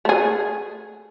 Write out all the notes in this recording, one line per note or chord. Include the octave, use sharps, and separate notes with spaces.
A3 G#4